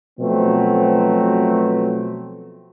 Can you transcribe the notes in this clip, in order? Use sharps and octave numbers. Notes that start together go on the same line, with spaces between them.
B2 F3 F#3 A3 C4